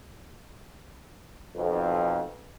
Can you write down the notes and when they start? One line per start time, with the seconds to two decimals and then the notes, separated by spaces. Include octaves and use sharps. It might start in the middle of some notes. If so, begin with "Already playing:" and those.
1.55 B1 F2